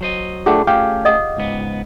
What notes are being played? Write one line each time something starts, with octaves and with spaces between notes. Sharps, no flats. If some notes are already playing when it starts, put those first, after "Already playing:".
F#3 C5 D#5
A3 D4 F4 G4 G#4 F#5
A3 C#4 G4 F5 G5
D#5 F#5 D#6
C#2 G#2 B3